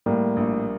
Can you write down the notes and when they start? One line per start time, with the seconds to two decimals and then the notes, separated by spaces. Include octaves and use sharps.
0.06 A2 G3 A#3
0.36 A#1